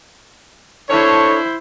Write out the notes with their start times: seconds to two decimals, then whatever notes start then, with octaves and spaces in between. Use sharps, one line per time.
0.90 D4 E4 A4 C5 C#5